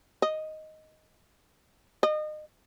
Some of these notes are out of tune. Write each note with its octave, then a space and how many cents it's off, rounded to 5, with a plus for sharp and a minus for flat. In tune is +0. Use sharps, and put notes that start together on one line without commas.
D#5 +5
D#5 -30